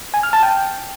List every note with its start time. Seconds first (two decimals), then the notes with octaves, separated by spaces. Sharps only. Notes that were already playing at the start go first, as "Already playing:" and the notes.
0.14 G#5
0.23 F6
0.33 A5
0.43 G5